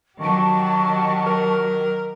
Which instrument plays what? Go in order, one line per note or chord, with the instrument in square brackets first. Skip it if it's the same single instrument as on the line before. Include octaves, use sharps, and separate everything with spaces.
[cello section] D#3 F#3 G4 [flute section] A5 C#6
[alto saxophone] A#4